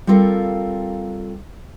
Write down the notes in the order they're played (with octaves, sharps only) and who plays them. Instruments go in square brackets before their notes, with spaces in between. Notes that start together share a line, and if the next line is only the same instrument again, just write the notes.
[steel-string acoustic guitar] G3 C4 F4 A4 A#4 F5